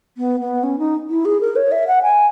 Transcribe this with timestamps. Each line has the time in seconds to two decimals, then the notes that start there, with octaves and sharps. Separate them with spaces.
0.18 B3
0.40 B3
0.63 C#4
0.79 D#4
1.10 E4
1.25 G#4
1.41 A#4
1.56 C#5
1.72 E5
1.87 F#5
2.02 G#5